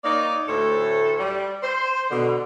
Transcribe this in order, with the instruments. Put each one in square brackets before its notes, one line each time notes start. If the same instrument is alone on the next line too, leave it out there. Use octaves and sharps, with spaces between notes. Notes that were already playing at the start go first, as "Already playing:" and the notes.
[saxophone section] A#3 D#4 C#5 D5
D2 A2 A4 C5 C#5
G3
C5
B2 D3